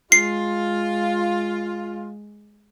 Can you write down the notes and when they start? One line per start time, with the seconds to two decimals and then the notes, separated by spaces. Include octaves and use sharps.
0.12 G#3 F4 C7